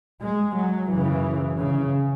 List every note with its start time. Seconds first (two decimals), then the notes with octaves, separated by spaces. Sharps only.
0.22 G#3
0.57 F#3
0.91 F#2 C#3 E3
1.60 C#3